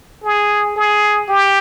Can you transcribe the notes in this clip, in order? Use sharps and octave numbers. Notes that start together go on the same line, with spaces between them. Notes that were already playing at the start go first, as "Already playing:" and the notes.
G#4
G#4
G4